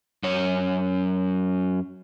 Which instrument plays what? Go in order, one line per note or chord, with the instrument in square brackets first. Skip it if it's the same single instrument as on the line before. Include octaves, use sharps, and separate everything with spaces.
[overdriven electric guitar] F#2 C#5